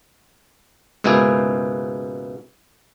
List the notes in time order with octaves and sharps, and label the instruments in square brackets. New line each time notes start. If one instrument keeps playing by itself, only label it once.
[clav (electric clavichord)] C#2 G#2 B2 A#3 E4 G#4